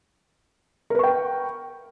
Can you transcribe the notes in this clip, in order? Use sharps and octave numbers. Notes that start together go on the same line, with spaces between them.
A#4 B4 G5 C#6